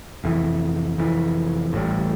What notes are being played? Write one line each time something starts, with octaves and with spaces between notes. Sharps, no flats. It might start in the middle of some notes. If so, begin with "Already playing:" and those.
F1 F2 E3
F1 F2 E3
A1 A2 G3